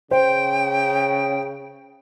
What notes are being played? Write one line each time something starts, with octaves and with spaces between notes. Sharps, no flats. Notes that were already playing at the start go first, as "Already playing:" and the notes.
C#3 C5 G5